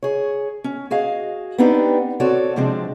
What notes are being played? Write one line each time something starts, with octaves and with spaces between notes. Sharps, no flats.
G#4 C#5
C#4
F#4 G#4 D#5 F5
B3 C4 D4 D#4 G4
C4 F#4 A4 C#5 D5
C3 F3 G#3 C4 D4